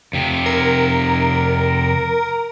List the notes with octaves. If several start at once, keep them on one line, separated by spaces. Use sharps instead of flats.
F2 C3
A#4